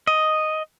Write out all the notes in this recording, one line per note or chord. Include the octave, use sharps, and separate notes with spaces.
D#5